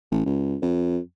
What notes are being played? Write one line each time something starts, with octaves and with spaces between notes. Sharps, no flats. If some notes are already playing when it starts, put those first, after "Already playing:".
A1
C#2
F2